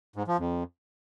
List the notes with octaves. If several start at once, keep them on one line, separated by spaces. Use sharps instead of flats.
G#2
F3
F2